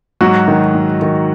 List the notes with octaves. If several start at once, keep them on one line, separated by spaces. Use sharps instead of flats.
G#2 F#3 F#4
D#3
G#2
D#3